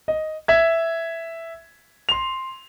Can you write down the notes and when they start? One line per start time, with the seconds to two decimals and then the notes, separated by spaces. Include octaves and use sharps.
0.08 D#5
0.48 E5 G#6
2.09 C6 F7